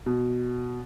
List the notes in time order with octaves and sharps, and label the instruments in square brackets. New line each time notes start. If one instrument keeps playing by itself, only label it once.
[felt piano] B2